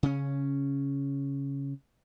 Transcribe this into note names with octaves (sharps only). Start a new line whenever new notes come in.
C#3 C#4